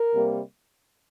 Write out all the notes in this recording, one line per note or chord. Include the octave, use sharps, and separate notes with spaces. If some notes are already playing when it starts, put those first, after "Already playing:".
Already playing: A#4
C3 G3 A#3